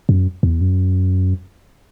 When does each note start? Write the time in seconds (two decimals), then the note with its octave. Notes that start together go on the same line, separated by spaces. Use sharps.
0.09 F#2
0.43 E2
0.61 F#2